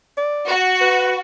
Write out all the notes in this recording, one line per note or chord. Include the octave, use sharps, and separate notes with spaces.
D5
F#4
B4